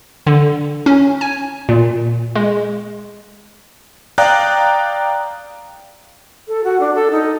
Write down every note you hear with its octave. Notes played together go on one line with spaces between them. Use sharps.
D3
C#4
G#5
A#2
G#3
D5 F5 G5 A#5 D#6 F#6
A4
F#4
D4
A4
D#4